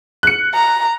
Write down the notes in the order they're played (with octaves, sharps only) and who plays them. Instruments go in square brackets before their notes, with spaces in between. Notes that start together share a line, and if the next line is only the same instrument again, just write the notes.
[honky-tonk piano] F#6 C#7
[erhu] A#5